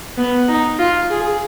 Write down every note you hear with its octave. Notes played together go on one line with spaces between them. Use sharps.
B3
D#4
F4
G#4